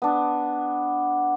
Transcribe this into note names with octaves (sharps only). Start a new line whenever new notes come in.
B3 D4